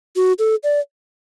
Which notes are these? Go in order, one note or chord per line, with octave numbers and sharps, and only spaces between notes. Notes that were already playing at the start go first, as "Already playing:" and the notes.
F#4
A4
D5